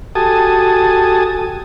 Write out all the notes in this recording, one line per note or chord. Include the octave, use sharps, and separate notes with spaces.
F#4 G4 A4 G#5 A5 D#6